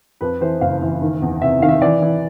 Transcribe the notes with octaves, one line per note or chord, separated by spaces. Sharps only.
F2 B4
E3 C5
F#1 F5
E3
D#3
E2
C3 E5
D#3 F5
E5
E3 D5
E3